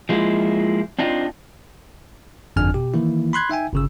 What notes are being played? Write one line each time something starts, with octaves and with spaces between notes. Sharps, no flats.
F3 G#3 A#3 E4 F4
C4 D4 D#4 F4
G1 F2 D4 G#5 F6
B2 G4
D#3 E3 A#3 E4
B5 C6 F#6 G#6
D#4 E5 G5 G#5
G1 C#3 E6